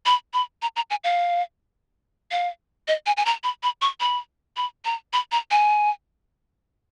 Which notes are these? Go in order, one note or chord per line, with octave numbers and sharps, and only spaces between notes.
B5
B5
A#5
A#5
G#5
F5
F5
D#5
G#5
G#5
A#5
B5
B5
C#6
B5
B5
A#5
B5
A#5
G#5